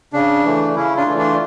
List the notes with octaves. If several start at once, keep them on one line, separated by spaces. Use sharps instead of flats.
C#3 D4
E3 A3
C#3 C#4 E4
D4 F4
E3 A3
D4 F4